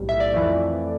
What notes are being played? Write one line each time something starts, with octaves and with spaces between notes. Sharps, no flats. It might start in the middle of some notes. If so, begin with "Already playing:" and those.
Already playing: B1 A2 G3
E5
D5
F2 E3 A3